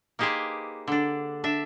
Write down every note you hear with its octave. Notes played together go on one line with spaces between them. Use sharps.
A#3 D#4 G4 G#4 B4 C5
D3 D4
D4 E5